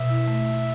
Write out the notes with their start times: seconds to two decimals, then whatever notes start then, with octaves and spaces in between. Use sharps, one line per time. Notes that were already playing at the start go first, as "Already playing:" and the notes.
Already playing: B2 E5
0.09 E4
0.28 A3